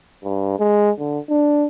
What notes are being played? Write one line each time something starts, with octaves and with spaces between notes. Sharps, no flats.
G2
G#3
D3
D4